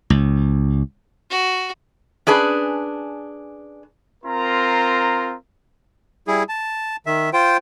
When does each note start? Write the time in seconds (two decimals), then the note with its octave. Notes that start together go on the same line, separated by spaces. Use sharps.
0.10 C#2
1.31 F#4
2.27 C#4 D4 G#4 B4
4.24 C4 F4 A#4 A#5 C6
6.28 G3 E4 G#4
6.49 A5
7.06 D#3 E5
7.33 F4 C5 G5